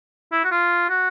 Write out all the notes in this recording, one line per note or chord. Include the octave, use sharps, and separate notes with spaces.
E4
F#4
F4
F#4